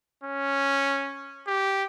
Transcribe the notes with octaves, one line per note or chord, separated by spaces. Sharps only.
C#4
G4